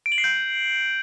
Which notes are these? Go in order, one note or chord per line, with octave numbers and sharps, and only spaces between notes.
D7
F#7
C7
G6